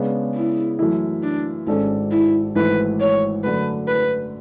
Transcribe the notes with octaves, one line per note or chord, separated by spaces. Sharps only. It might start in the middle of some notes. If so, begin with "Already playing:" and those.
Already playing: C#3 G#3 B3 D4
E4
F#2 E3 A3 E4
D4
G#1 G#2 G#3 C#4 D4 A4
E4
G#1 G#2 E3 A3 E4 B4
C#5
F#2 D3 A3 B4
B4